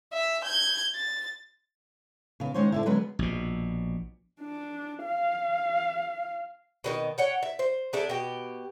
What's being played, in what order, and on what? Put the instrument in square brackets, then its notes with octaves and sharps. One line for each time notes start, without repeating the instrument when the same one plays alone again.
[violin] E5
G6 G#6
A6
[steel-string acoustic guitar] C#3 B3
D#3 G#3 C#4 C5 C#5
D3 C4 E4
D3 F#3 G#3 B3 C#4 B4
[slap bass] A#1 B2
[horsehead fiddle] D4
F5
[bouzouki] B2 D3 D#3
C#5 F#5 G5
E5
C5
A3 D4 G#4
B2 G4